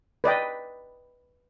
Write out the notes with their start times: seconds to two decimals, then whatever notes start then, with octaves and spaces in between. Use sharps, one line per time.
0.24 B4 D5 D#5 G5